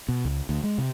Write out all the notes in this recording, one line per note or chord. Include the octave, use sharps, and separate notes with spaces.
B2
C#2
D2
G#3
C3